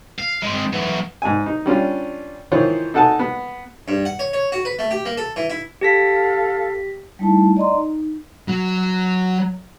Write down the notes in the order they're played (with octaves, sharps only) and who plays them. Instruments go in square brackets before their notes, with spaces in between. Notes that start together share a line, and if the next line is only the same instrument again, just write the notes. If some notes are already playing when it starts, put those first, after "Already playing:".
[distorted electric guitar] F5
G#3 C4
E3 F#3
[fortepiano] G#2 G#5
D#4
G3 C#4 D4 F4
D#3 E3 F4 C5 C#5
D#4 A4 F#5 G#5 A5
B3
[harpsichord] G2
F#5
C#5
C#5
F#4
B4
A3
G4
A#3
A4
E3
E4
[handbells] G4 A#6 B6 [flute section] A4 F5
[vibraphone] G3 A3 D#4 E4 A5
D5 D#5 A#5 C6
D#4
[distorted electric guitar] F#3